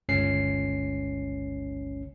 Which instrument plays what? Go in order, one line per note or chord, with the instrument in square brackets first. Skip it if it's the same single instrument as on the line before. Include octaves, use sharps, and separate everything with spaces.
[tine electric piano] G1 C#2 C#4 C7